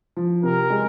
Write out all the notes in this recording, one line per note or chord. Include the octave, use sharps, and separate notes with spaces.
F3
C3 A#4
G#3